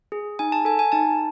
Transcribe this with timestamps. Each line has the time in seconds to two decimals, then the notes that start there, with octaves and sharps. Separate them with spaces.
0.12 G#4
0.39 D#4 G#5
0.52 A5
0.65 A4 G#5
0.79 G#5
0.92 D#4 A5